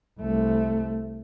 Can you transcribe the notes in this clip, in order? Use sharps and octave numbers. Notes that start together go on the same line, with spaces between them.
C2 A3